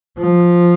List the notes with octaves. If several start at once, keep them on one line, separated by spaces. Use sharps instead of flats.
F3